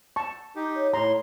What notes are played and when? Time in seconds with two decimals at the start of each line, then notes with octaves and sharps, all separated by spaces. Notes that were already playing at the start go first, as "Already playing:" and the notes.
0.16 A5 C#6
0.56 D#4 G4
0.75 C#5
0.93 A2 C#5 A#5 C6